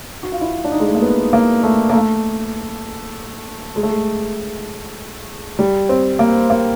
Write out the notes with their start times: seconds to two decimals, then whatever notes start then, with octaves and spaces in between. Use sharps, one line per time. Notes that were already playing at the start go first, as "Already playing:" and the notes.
0.23 F#4
0.32 F4
0.41 E4
0.64 D4
0.72 D#4
0.80 G#3
0.87 A3
0.95 A#3
1.02 B3
1.33 A#3
1.63 A3
1.90 A#3
1.93 A3
3.76 G#3
3.83 A3
3.90 G#3
5.59 G3
5.89 C4
6.19 A#3
6.50 A#3